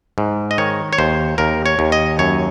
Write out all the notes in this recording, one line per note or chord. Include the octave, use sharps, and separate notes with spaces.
G#2
D#5
D#3 C#5
C#5
D#2 C5
D#2 A#4
C#5
D#2
D#5
F#2 C#5